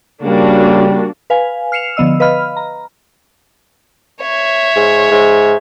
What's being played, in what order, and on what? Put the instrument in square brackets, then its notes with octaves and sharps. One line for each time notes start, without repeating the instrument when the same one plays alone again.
[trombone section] C#3 G3 [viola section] A#3 D4 F#4
[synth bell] B4 F5 G#5
F6 C7 C#7 E7 F7
D3 F3 B3 D#5 E6
B4 D#5 F5 B5 F6
A#5
[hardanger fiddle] C#5 E5
[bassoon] G#2
G#2